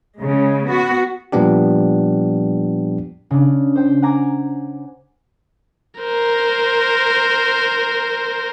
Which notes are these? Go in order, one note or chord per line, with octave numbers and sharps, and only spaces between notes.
C#3 G#3
B3 F#4
A#2 F3 G3 B3 D4 G4
C#3 D4
C5 G5
F#5 G#5 A#5 D6 G#6
A#4 C5